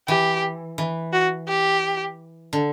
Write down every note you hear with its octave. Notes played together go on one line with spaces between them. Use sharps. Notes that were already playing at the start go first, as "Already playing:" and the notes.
E3 G4
E3
F#4
G4
D3